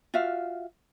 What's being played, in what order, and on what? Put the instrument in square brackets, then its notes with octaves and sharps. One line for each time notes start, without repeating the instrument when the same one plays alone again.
[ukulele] F4 F#4 E5 F5